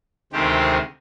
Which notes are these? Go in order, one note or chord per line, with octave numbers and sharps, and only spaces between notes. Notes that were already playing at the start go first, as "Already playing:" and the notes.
D2 C3 D#3 G#3 C4 G4